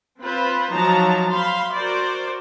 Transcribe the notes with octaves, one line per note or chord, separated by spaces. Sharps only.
C4 F4 B4 C5
F3 F#3 D#4 A5 A#5
C5 F5 B5 C6
F#4 A#4 C5 D5